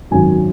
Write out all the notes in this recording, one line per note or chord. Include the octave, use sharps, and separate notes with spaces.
G#1 F#2 D#3 F#3 G#5